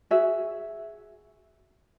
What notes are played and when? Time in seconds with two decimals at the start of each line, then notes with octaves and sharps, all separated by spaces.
0.11 F#4 G#4 E5